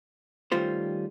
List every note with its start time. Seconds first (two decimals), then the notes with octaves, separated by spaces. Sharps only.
0.52 D#3 G3 A3 C#4 F4 C5